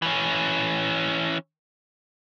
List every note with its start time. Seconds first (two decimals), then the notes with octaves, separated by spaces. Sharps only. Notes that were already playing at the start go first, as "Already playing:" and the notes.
0.02 E3 C#4